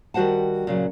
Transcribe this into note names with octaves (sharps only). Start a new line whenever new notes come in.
D#3 G3 F#4 C5 F#5 A5
A#2 C#3 F#3